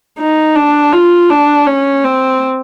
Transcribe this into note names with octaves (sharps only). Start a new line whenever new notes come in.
D#4
D4
F4
D4
C#4
C4